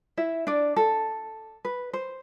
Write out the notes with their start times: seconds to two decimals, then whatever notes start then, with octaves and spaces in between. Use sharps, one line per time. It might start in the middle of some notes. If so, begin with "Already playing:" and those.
0.17 E4 E5
0.47 D4 D5
0.76 A4
1.65 B4
1.93 C5